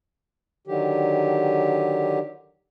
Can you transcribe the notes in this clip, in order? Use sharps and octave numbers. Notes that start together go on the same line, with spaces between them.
D3 D#3 F#3 G4